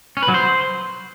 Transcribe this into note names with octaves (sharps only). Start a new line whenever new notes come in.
C#4
B4
F#3
C5